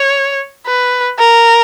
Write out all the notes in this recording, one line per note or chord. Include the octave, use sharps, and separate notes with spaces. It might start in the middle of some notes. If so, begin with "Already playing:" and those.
Already playing: C#5
B4
A#4